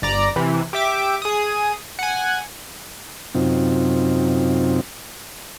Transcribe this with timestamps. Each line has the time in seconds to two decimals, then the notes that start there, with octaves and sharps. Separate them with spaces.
0.02 G1 D5 A#5
0.36 C3 E3
0.73 G4 E5 D6
1.22 G#4 D#6
1.99 F#5 G#5
3.35 F#2 C3 C4 D#4 F4